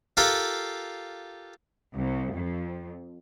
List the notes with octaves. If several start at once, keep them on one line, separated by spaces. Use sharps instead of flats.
F4 G4 A4 A#4 F5 F#5
C2
F2